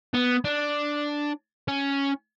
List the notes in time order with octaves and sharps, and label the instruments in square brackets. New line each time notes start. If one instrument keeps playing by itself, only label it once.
[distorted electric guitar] B3
D4
C#4